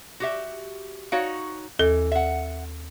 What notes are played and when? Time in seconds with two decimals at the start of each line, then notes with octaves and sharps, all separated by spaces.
0.20 F#4 G4 E5
1.12 D#4 F#4 C#5 F5
1.79 D#2 E3 A4
2.12 E5 F#5